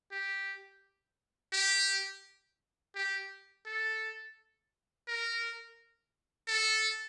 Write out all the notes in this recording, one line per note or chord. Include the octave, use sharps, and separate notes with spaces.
G4
G4
G4
A4
A#4
A4